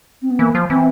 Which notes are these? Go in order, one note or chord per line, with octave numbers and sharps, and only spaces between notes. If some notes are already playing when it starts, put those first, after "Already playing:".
C4
B3
E3 A#3
F3
E3 C4